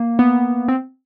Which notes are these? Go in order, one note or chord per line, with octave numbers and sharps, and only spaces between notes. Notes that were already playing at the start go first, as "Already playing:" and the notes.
Already playing: A#3
B3
C4